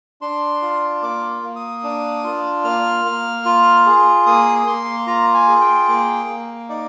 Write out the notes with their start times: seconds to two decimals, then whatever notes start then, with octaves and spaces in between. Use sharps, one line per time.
0.21 D4 C6
0.62 F4
1.02 A#3 D6
1.43 A#3
1.56 D#6
1.84 D4
2.24 F4
2.64 A#3 F6
3.05 A#3
3.46 F4
3.86 G#4
4.26 A#3 D#6
4.67 A#3 C6
5.07 F4 A#5
5.34 G#5
5.48 G#4
5.61 G5
5.88 A#3
6.29 A#3
6.69 D#4 D5